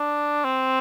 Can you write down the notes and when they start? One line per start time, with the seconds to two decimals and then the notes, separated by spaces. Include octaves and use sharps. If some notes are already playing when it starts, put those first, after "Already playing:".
Already playing: D4
0.44 C4